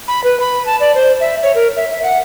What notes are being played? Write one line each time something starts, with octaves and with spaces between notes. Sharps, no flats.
B5
B4
B5
A5
D5
C5
E5
C#5
A#4
E5
E5
F#5